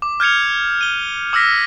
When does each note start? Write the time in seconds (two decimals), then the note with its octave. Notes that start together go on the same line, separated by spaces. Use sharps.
0.02 D6
0.20 F6 G6 G#6 C#7 F7
0.81 D#7 G7
1.33 D6 E6 F6 A#6 B6